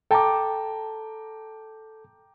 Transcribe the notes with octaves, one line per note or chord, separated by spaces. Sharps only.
A4 G5 A5 A#5 D6